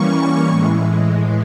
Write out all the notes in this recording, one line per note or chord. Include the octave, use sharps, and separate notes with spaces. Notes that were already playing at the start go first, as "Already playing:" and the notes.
Already playing: E3 G3 A#3 C#4 C#6
A2 E3 G#3